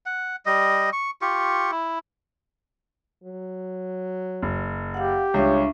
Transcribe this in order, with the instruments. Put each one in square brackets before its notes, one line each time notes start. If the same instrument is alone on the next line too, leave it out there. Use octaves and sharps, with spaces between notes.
[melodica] F#5
G3 D#5
C#6
F4 G4 C#6
E4
[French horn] F#3
[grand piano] F#1
[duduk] G4 [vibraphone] F5 F#5
[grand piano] C#2 G3 [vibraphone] D4 E5 C#6 [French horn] C#5